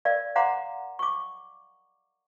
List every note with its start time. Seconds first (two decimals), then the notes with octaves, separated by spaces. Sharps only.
0.05 A#4 D5 F5
0.36 F5 F#5 A#5 C6 D6
0.99 C#6 D6